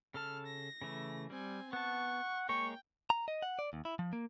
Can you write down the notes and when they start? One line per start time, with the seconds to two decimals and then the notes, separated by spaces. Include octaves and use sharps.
0.14 C#3 A4 A5 F6
0.46 A#6
0.82 C#3 E3 A3
1.30 G3 C4 G#5
1.73 B3 F#5 A5 C#6
2.49 G#3 A#3 C#5 G5 C#6
3.10 A#5
3.28 D#5
3.42 F#5
3.59 D5
3.73 D#2
3.85 E4
3.99 F3
4.13 A#3